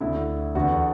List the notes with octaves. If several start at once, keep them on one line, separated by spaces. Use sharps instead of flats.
D2 D3 E4
E2 D3 F#4